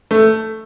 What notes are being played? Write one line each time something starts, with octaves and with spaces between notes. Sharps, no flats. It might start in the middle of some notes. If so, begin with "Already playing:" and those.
A3